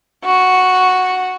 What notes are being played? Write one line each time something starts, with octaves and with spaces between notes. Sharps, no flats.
F#4